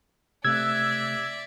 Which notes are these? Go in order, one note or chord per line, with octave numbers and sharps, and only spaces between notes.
C3 A3 D5 E5 E6 F#6 G#6